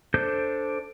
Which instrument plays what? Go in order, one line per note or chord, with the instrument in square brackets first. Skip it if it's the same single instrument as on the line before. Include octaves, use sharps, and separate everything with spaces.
[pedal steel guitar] D4 A4 C5 G6